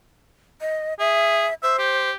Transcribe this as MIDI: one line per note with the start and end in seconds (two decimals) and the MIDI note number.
0.61 0.94 75
1.00 1.47 68
1.00 1.54 76
1.63 2.10 72
1.63 1.76 76
1.79 2.14 67